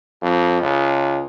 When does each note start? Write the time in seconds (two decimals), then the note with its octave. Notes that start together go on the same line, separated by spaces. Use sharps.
0.22 F2
0.62 C#2